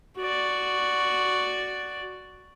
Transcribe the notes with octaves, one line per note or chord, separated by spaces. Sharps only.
F#4 D5